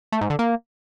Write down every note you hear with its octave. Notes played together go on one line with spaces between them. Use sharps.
A3
G#2
D3
A#3